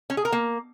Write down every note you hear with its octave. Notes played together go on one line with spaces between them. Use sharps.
C#4
G#4
A#4
A#3